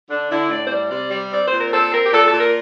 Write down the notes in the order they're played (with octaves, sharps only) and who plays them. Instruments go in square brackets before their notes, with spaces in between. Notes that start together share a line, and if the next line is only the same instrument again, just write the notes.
[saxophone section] D3 D4
D3 E4
A2 D5
C5
G3 D5
C3 D5
G3 D5
C4 D5
C5
A#2
A#4
C4 A4
C4 A#4
G4
A#2 A4
A4
A#2
A#4